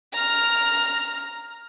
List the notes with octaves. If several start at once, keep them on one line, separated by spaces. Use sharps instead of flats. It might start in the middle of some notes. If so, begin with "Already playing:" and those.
A#5 F6